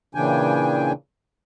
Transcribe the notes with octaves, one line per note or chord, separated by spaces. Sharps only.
A#2 C#3 E3 D4 G5 G#5